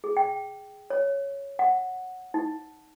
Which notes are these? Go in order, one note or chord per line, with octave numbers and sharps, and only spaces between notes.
G#4
G5
C#5
F#5
D#4